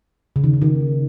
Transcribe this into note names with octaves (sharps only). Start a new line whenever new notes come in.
C#3
D#3
C#3
D#3